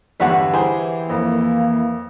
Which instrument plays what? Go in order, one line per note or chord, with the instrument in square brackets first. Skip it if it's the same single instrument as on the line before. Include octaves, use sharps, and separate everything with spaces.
[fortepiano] E2 G2 D3 [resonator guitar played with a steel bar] B4 C#5 F#5
[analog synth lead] E3 [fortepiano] G4 G#4 C5
[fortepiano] F2 [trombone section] A#3